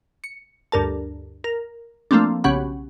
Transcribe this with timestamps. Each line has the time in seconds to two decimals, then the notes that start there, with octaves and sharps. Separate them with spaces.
0.24 C#7
0.72 D2 G2 A#4 A5
1.44 A#4
2.11 F3 A3 A#3 C4 D4
2.44 B1 C#3 C#4 G4 F#5 B5